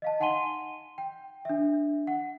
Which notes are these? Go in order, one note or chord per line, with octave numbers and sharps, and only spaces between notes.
D#5 F5 A5
D#4 F#5 G#5 C6 D#7 G7
G5
D4 E5
F#5